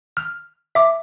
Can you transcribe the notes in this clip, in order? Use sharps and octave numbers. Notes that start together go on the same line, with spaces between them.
F6
E5 D6